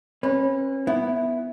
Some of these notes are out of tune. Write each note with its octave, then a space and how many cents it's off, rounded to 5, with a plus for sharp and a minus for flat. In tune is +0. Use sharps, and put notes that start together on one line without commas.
C#4 -35 B4 -10
B3 +0 E4 +0